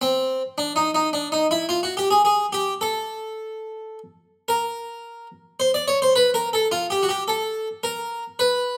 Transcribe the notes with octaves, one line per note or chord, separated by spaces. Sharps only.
C4
D4
D#4
D#4
D4
D#4
E4
F4
F#4
G4
G#4
G#4
G4
A4
A#4
C5
D5
C#5
C5
B4
A#4
A4
F4
G4
F#4
G4
A4
A#4
B4